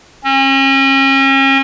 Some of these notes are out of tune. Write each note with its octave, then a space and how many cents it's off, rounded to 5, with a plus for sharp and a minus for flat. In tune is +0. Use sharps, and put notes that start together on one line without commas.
C#4 -40